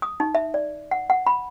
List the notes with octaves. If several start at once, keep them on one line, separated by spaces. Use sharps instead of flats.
D#6
D#4
E5
D5
F#5
F#5
B5